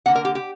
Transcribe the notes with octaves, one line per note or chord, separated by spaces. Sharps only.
D3 A#3 F#5
A#4
G4
G4